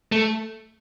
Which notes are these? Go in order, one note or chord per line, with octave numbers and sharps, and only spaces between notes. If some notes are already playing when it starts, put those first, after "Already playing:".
A3